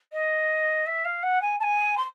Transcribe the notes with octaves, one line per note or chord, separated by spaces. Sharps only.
D#5
E5
F5
F#5
G#5
A5
G#5
C6